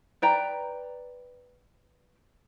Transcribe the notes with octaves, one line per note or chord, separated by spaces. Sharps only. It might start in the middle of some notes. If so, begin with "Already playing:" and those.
B4 D5 G5 A#5